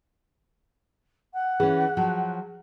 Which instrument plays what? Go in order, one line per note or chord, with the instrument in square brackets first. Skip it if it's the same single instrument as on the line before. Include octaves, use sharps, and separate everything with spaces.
[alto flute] F#5
[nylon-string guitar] E3 C#4 [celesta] G#4
[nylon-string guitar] F3 F#3